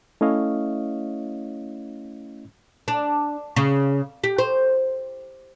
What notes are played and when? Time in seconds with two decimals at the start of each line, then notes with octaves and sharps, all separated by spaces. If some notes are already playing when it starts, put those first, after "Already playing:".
0.21 A3 C#4 E4 C#5 D#5 F5
2.88 D4
3.56 C#3
4.24 G4
4.38 C5